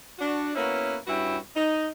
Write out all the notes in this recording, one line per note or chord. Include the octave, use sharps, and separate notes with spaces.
D4 F#4
A#3 B3 C#4 E4 F#4 B4
G2 C#4 E4 F#4 B4 G5
D#4